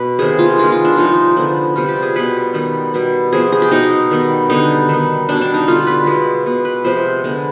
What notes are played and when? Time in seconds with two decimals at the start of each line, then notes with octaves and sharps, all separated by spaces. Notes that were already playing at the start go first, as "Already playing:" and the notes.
Already playing: B2 B4
0.19 C3 D#3 B3 G#4
0.39 F4
0.58 D#3 G#3 B3 F4
0.72 F4
0.85 D4
0.97 C3 F3 G#3 D#4
1.36 D3 F3 B3
1.76 C3 G3 B3 F4
1.89 G4
2.03 G#4
2.16 B2 G3 B3 B4
2.54 D#3 G3 B3
2.94 B2 G3 B3
3.32 C3 F3 B3 G#4
3.52 G#4
3.62 G4
3.71 B2 G#3 B3 D#4
4.11 D#3 G3 B3
4.50 D3 G3 B3 D#4
4.89 D#3 B3
5.29 B2 G3 B3 D4
5.41 D4
5.54 D#4
5.67 D3 G3 B3 F4
5.87 B4
6.06 B2 G#3 B3
6.46 B2 B3
6.65 B4
6.85 C3 F3 G#3 B3 C5
7.24 D3 G#3 B3